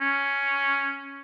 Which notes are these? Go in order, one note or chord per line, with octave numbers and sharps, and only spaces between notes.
C#4